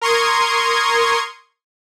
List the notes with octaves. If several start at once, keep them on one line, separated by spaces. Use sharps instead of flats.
A#4 A#5 C6 C#6 D#6 G#6